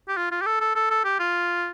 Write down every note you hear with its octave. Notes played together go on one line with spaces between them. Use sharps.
G4
F4
F4
G4
A4
A4
A4
A4
G4
F4